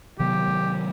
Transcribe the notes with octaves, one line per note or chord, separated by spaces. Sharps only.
C3 D#3 F#3 B3 G4